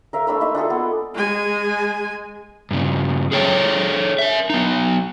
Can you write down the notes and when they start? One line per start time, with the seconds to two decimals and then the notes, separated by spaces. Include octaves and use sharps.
0.13 A#4 E5 F5
0.27 A3 D4 B5 E6
0.40 A#3 D#4 E5 C6
0.55 D4 F4 G#4 A4
0.70 B3
1.14 G#3 G#5
2.71 G2 C#3
3.32 G#4 A4 C#5 E5 G5
4.19 A#4 E5
4.50 B3 D#4